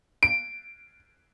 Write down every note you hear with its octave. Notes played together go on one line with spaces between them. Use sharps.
D7